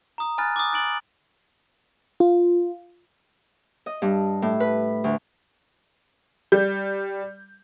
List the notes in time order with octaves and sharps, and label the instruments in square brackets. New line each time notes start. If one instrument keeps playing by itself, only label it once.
[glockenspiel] A#5 D#6
G#5 B5 F6 F#6 A6
D6 D#6
F#6 A6 D7 F#7
[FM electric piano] F4
[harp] D#5
G2
A2
B4
D2
[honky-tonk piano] G3 G6